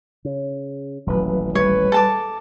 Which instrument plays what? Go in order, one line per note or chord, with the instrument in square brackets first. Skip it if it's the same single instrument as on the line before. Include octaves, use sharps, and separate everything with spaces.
[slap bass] C#3
[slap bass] D#1 A1 [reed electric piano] F#3 B4
[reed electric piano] G3 [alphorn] B4 [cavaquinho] C#5
[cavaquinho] A4 A5 D6